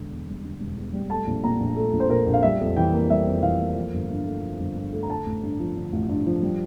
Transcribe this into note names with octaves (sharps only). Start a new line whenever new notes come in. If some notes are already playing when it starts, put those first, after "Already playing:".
Already playing: E1 D3
E2
G3
D3
E1
E2
G3
A3 A5
A#1
A#2 A#5
A#1
A3
A#1
C5
A#2 A#4
A#1
F5
G3 E5
F2
E3 G5
A#3
G3 E5
F2
E3 F5
A#3
F3
G1
G2
A3
F3
G1
G2
A3
A#5
D3 A5
A1
G2
F3
D3
A1
G2
F3
G3